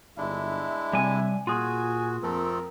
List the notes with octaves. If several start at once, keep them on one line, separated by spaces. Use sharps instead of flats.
G1 G#3 D4 E4 E5
C3 G3 C#5 G#5
A#2 F4 F#4 G#4 G#5
F2 A3 C4 A4 A#4